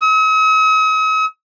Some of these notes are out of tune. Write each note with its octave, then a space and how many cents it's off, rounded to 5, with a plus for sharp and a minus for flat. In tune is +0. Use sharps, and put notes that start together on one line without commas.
D#6 +45